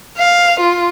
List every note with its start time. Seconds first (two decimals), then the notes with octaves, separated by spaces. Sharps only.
0.18 F5
0.59 F4